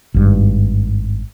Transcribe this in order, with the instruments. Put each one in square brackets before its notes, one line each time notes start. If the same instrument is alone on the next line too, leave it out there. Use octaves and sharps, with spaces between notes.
[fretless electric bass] G#1 G2